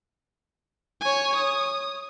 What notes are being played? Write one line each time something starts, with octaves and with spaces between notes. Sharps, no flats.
C#5 G#5
D#6